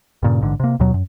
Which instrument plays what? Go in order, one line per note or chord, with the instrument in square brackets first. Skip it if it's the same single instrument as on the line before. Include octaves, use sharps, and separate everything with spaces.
[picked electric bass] G2 A#2 C#3
A1 G#2 D3
C3 A#3
D#2 B2 F#3
F#2